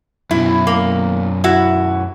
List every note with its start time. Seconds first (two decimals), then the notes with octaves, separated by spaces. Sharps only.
0.31 F#2 B2 E4
0.67 A#3
1.44 E4 F#4